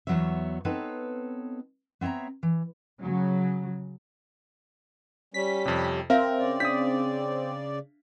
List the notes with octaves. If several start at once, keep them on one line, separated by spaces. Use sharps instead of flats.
E2 B2 F#3 B3 C#5 E5
B3 C4 D#4 A4 B4 C#5
B3 C4 C#5 E5 A#5
E3
C#3 F#3
G3 C#4 B6
F2 C3
C4 A#4 E5 F5
C#3 D5
D4 D#6 B6